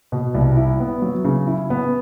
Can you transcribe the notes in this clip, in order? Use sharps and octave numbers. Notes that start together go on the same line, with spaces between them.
B2
C2
E4
B3
F#3
C#3
E4
B3